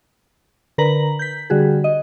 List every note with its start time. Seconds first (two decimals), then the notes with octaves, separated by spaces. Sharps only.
0.78 D3 A#4 B4 A#5 F#7
1.19 G6 B6
1.50 D3 G3 F#4 G#4
1.84 D#5